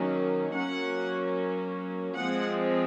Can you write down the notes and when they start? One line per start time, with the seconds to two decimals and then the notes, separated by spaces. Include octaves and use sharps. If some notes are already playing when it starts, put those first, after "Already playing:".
Already playing: D#3 F#3 A#3 C#4
0.54 F#3 A#3 C#4 F#5
2.15 F3 G#3 C4 F#5